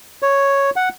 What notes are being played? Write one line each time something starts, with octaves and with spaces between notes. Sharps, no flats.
C#5
F#5